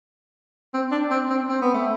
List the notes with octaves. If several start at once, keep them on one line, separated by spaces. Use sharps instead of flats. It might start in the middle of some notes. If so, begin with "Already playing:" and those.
C4
D4
C4
C4
C4
B3
A3